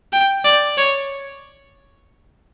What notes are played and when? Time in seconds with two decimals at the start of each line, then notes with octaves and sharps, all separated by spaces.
0.13 G5
0.45 D5
0.78 C#5